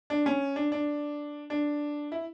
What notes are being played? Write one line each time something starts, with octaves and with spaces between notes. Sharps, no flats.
D4
C#4
D4
D4
D4
E4